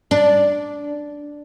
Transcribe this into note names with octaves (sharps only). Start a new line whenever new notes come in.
D4